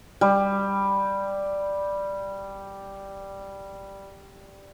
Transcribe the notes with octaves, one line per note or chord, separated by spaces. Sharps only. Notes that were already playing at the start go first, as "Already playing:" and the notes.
G3